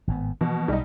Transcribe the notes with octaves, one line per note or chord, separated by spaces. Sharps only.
G#1 A2 B3
B2 E3 F3 A#3
B1 G3 D#4